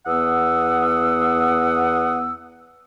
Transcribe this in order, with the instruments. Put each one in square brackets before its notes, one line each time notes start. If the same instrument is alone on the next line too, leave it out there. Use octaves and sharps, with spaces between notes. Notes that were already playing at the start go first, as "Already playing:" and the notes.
[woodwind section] E2 B3 F#5 D#6 E6